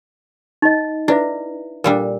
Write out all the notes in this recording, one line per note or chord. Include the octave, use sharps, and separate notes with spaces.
D#4 D#5
D4 E4 B4 E5
A#2 G3 D4 A#4